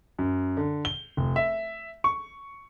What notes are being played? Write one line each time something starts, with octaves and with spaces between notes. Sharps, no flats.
F#2
D3
G7
F1
E5
C#6